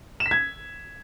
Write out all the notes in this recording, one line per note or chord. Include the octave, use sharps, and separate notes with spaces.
E7
B6
G#6